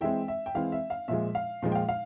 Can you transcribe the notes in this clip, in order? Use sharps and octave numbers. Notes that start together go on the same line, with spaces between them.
E3 G#3 C4 E5 G5
E5
G5
E3 G#3 C4 F5
E5
F5
A#2 F3 G#3 E5
F5
A#2 F3 G#3
G5
F5
F5